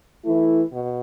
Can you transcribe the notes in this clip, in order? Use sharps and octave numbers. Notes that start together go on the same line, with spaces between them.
E3 A3 E4
B2